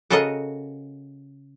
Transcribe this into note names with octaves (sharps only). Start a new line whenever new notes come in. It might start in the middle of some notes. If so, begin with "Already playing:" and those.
C#3 F#4 A4 A#4 D#5 F#5